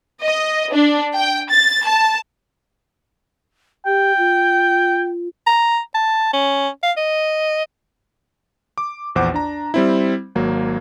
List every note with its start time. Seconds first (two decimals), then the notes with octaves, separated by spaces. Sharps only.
0.22 D#5
0.73 D4
1.16 G5
1.50 A6
1.87 A5
3.86 G4 G5
4.18 F4
5.47 A#5
5.95 A5
6.33 C#4
6.83 F5
6.97 D#5
8.78 D6
9.15 A#1 E2 C5 F#5 D6
9.34 D4 A#5
9.74 G3 C4 E4
10.35 G#1 F#3 A#3